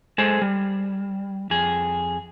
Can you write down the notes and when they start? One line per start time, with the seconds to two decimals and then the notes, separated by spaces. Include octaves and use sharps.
0.18 G#3 G#4 A4 C5
0.42 G3
1.50 F2 G#4